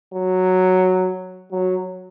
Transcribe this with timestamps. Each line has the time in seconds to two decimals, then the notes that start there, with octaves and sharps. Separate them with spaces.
0.14 F#3
1.51 F#3